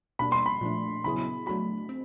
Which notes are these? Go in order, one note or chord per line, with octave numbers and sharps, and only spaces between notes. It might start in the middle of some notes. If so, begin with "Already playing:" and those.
B2 G3 A#3 D4 B5
C6
B5
A#2 F3 A3 D4
C#3 F#3 B3 E4 G#4 B5
F#3 A3 D4 F#4 B5
C4